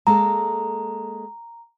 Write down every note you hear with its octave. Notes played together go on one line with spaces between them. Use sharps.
G#3 A#3 A4 A#5